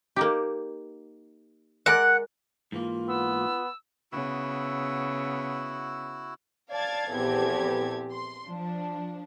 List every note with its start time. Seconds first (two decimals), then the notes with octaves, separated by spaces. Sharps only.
0.16 A#3 D#4 G4
1.86 G#3 A#4 D5 F#5
2.72 G#2 E3 A#3 F4
3.08 B3 E6
4.12 C#3 B3 E4 F#4 E6
6.72 D5 F5 A5 G#6 A6
7.12 A#1 E2 C4 G4 A4 G#6
8.13 C6
8.47 F3 D4